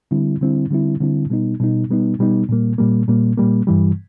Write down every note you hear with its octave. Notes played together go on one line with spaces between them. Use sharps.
D3 G3 C4 E4
D3 G3 C4 E4
D3 G3 C4 E4
D3 G3 C4 E4
B2 G3 B3 D#4
B2 G3 B3 D#4
B2 G3 B3 D#4
B2 G3 B3 D#4
A#2 G3 A#3
A#2 G3 A#3
A#2 G3 A#3
A#2 G3 A#3
G2 E3 G3